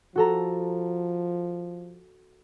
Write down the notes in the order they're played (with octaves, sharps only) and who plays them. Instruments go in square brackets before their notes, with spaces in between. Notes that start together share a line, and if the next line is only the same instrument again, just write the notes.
[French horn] F3 [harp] F#4 A4 A#5